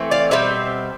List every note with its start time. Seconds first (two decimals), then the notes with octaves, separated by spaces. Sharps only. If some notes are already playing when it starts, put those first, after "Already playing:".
Already playing: E3 A3 C4
0.11 D5 F5
0.31 B2 G3 C4 C5 E5